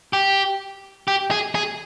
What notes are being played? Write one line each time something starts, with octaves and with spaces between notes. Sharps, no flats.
G4
G4
G#4
G#4